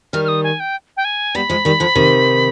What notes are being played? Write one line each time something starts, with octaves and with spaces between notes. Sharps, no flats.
D#3 G3 F6
F6
D#6
G#5
G5
G5
G#5
G3 B3 B5
F3 G#3
D#3 G3
D3 F3
C3 D#3